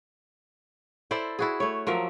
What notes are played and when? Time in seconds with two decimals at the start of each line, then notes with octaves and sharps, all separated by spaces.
1.11 E4 A4 C5 D5
1.39 E4 F#4 G#4
1.60 A3 C#5
1.87 F3 F#3 A#4 E5